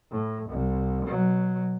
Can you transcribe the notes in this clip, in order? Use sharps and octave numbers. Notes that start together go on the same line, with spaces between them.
A2
C2
B2 F#3